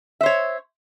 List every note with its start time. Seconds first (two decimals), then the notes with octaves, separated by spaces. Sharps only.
0.21 E5
0.23 C5
0.26 C#5